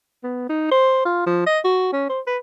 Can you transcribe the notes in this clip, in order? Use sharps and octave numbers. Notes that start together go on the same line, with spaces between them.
B3
D#4
C5
F4
F3
D#5
F#4
C#4
C5
B4